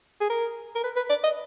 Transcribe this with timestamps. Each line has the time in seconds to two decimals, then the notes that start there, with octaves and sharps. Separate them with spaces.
0.21 G#4
0.30 A#4
0.76 A#4
0.84 B4
0.97 B4
1.10 D5
1.24 D#5